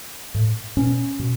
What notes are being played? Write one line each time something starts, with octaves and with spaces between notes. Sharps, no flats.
A2
B2 C#4
B2